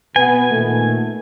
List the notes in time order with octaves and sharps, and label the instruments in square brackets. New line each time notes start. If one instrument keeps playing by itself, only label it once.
[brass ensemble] B2 B3 [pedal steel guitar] G#5
[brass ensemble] A#2 D#3 A3